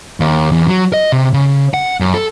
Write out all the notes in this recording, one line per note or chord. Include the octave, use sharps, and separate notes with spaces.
D#2
E2
F#3
D#5
C3
C#3
F#5
F#2
A4